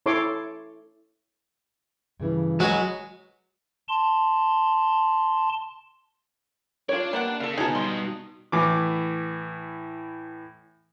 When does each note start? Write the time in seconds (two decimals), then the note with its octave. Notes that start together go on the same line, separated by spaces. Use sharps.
0.06 E4 A4 C#5 C6 D6
2.20 G2 C#3 E3
2.60 F#3 G#3 F#4 B4
3.88 A5 C6
6.89 D4 F4 C#5 D5
7.13 G3 A#3 B3 F#5
7.40 C#3 A4 F5
7.58 B2 D#4 G#4 C#5 G#5 A5
7.75 G2 C6
8.52 A2 E3 D6